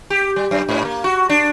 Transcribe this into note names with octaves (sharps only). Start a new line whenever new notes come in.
G4
G3
F#2
G#2
A#3
F#4
D4